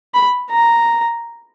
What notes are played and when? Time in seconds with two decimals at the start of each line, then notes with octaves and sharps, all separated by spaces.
0.14 B5
0.50 A#5